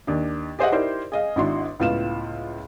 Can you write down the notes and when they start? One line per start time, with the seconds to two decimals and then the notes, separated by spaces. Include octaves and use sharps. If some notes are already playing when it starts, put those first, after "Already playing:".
0.07 D#2 D4
0.59 G4 G#4 C5 D#5 E5 F#5
0.72 D#4 E4 G4 A#4 C5 D5
1.12 G#4 D#5 F5
1.36 G#1 D4 E4 F#4 C6
1.80 C#2 A2 B3 F4 F5 E7